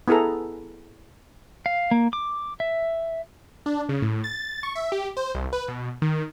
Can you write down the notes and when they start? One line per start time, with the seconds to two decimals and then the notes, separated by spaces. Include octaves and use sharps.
0.08 B3 E4 G#4 A4 A#5
1.66 F5
1.91 A#3
2.13 D6
2.60 E5
3.66 D4
3.89 C#3
4.02 A2
4.24 A6
4.63 C#6
4.75 E5
4.92 G4
5.17 C5
5.35 C2
5.53 B4
5.68 B2
6.02 D#3